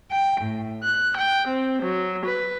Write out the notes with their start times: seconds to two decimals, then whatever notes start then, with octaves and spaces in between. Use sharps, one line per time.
0.11 G5
0.41 A2
0.85 F#6
1.18 G5
1.48 C4
1.84 F#3
2.26 B4